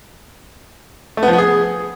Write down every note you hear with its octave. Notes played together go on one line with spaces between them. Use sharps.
A3
B3
F3
B3
G#4